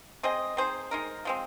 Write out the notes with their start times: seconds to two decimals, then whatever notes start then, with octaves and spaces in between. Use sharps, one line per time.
0.23 C4 G#4 C5 D#5
0.57 C4 D#4 G#4 C5
0.91 G#3 D#4 A#4
1.25 F3 G#3 C4